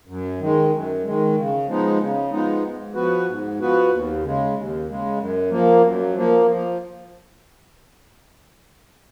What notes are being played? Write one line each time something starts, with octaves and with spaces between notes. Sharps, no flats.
F#2
D#3 G#3
F#2
D#3 G#3
C#3
F3 G#3 B3 D#4
C#3
F3 G#3 B3 D#4
G#2
F3 B3 F#4 B4
G#2
F3 B3 F#4 B4
D#2
C#3 G#3
D#2
C#3 G#3
F#2
F3 A#3
F#2
F3 A#3
F3